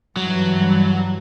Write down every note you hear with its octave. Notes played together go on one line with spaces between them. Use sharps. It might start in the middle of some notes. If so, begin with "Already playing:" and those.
G2 E3 F#3